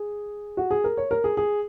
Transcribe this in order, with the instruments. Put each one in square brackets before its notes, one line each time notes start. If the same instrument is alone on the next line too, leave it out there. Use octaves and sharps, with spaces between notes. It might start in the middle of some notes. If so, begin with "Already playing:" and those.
Already playing: [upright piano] G#4
F#4
G#4
A#4
C#5
A#4
G#4
G#4